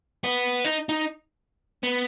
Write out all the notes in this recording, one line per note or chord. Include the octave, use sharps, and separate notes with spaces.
B3
D#4
D#4
B3